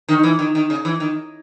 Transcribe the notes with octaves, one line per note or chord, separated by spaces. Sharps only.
D#3
E3
D#3
D#3
C#3
E3
D#3